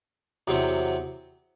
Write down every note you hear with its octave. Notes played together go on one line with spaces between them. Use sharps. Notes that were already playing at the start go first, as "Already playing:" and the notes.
E2 C3 F#3 C4